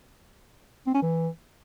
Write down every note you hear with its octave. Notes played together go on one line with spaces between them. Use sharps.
C4
C#4
E3